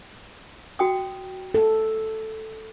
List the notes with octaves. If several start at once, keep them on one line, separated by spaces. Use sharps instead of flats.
F#4 G5 D#6
A4